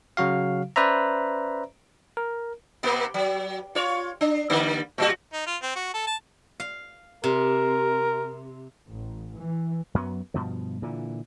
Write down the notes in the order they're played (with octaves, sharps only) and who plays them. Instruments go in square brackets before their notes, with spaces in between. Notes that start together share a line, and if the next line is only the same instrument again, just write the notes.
[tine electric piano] C#3 F#3 F#4 F5
C#4 B4 C5 D5 E5 A#5
A#4
[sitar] C3 A#3 B3
F#3
F4 C#5
D4
D3 G3 A#3
A2 G3 F#4
[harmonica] D#4
F4
C4
F#4
A4
A5
[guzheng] F5
[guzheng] C3 [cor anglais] A#4
[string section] A1
E3
[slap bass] F#2 F#3 B3
G2 B2 F3
A#2 D3 E3